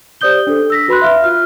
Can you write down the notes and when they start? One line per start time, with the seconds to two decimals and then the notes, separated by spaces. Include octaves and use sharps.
0.21 G4 C5 D5 D#6 G6 G7
0.47 D4 A4
0.70 E6 A#6 B6
0.88 F#4 B4 B5 C6 F#6
1.02 E5 F5 F6
1.24 F4 F6